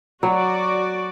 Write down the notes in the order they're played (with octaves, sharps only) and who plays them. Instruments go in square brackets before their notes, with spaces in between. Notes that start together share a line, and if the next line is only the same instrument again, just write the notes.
[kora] F#3 [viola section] F#4 D5